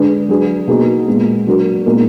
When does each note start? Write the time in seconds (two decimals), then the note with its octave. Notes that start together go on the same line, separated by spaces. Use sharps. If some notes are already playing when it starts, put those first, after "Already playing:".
Already playing: D3 G#3 D4 G#4 B4
0.29 F#3 D4 G#4 B4
0.68 B2 A#3 D#4 G#4
1.07 A#2 G#3 B3
1.47 F#3 D4 F#4 A#4
1.86 A#2 G#3 B3 D#4 A#4